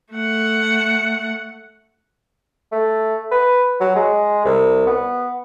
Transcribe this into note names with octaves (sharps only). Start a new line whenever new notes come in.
A3 F#5
A3
B4
F#3
G#3
C2
B3